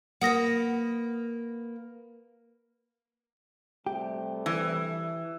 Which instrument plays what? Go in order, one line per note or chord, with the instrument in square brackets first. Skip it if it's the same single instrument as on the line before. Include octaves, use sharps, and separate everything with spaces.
[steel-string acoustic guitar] A#3 B4 [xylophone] F#5 D#6 A#6
[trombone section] C3 G3 A3 [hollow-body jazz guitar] G4
[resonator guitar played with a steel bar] E3